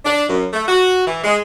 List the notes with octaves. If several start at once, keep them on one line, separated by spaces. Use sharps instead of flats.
D4
F#2
A3
F#4
E3
G#3